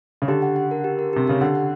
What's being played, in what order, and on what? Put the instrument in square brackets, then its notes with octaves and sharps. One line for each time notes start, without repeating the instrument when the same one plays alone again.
[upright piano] C#3
[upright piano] D3 [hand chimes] G4
[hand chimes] F#5
F#5
A#4
G4
A#4
[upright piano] C3 [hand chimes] G4
[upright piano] C#3 [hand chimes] G4
[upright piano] D3 [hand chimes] F#5
[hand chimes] F#5